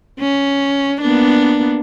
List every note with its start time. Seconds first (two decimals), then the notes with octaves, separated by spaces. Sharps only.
0.20 C#4
1.01 A#3 B3 D4